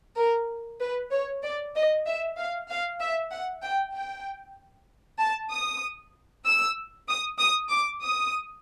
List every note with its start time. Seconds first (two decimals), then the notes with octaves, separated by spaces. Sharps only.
0.18 A#4
0.81 B4
1.12 C#5
1.43 D5
1.74 D#5
2.06 E5
2.37 F5
2.69 F5
3.00 E5
3.31 F#5
3.63 G5
3.94 G5
5.19 A5
5.51 D#6
6.45 E6
7.08 D#6
7.39 D#6
7.71 D6
8.02 D#6